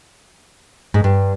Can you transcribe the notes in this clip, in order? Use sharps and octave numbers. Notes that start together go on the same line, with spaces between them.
G#2
G2